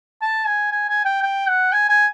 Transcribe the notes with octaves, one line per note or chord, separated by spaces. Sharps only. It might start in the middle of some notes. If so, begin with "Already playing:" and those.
A5
G#5
G#5
G#5
G5
G5
F#5
G#5
G#5